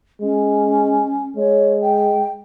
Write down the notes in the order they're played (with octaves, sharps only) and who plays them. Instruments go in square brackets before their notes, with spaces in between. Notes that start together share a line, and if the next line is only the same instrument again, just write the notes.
[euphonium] G#3 [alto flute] C#4
[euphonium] G#3 [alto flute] C#5
[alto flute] G5